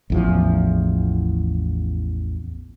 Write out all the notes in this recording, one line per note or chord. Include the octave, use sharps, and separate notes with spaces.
A1 E2 F3